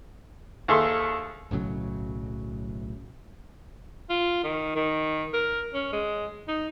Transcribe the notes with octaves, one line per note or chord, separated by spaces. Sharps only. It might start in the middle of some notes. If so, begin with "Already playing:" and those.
D#2 G#4 A4 E5 C6
B1 A2 C#3 F#3
F4
D#3
D#3
A#4
C#4
G#3
D#4